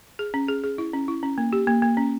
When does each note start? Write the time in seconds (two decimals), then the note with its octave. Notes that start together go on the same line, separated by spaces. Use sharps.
0.19 G#4
0.34 C#4
0.49 G#4
0.64 G#4
0.78 E4
0.94 C#4
1.08 E4
1.23 C#4
1.38 A#3
1.53 G4
1.67 A#3
1.82 A#3
1.97 C#4